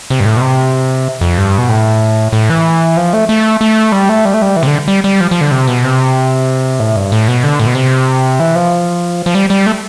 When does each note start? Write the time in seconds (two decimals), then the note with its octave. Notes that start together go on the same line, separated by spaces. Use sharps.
0.10 C3
0.20 G2
0.25 A2
0.37 B2
0.41 C3
1.21 F2
1.38 G2
1.58 B2
1.69 A2
2.32 A2
2.50 E3
2.97 F3
3.13 A3
3.29 A3
3.61 A3
3.92 G3
4.09 A3
4.25 G3
4.34 A3
4.42 G3
4.56 E3
4.63 C3
4.67 D3
4.88 G3
5.04 G3
5.21 F3
5.31 F3
5.41 D3
5.51 C3
5.67 B2
5.84 C3
6.80 A2
6.96 G2
7.12 A2
7.28 B2
7.44 D3
7.60 A2
7.67 B2
7.75 C3
8.40 E3
8.55 F3
9.26 F3
9.35 G3
9.50 G3
9.66 A3